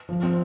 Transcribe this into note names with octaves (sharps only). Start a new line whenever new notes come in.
F3
C4